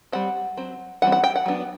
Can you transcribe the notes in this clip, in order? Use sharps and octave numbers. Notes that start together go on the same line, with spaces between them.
G3 C4 F#5
F#3 C4
E3 G3 C4 F#5
F#5
G5
F#5
F#3 B3 D4